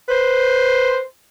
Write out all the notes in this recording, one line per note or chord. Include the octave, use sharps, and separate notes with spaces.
B4 C5